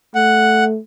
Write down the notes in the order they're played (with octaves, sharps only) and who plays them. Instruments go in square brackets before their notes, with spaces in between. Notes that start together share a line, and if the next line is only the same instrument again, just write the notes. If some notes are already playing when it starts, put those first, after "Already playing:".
[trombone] A3 [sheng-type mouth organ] F#5